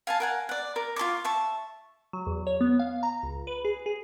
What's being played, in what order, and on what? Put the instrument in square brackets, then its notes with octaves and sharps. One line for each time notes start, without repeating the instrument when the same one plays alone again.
[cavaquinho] F5 G#5 A5
A#4 F#5 G#5
D5 F#5
A#4
F4 A4 C#6 D6
E5 A5 C#6
[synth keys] F#3
E2
C#5
B3
F5
A#5
C#2
B4
G#4
G#4